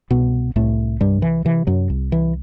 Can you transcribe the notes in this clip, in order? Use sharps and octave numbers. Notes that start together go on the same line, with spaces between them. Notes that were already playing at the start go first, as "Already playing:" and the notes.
C2 B2 B3
C2 A2 A3
G2 C3 G3
E3
C3 E3
F#2 F#3
C2
E3